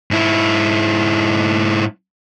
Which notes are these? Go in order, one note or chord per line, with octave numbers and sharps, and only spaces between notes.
G#2 E4